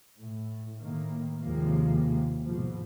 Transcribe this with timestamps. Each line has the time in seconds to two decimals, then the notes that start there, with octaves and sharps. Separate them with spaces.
0.19 A2
0.79 A2 D#3 A#3
1.41 D#2 C3 F3 G#3 A#3
2.45 G#2 B2 F3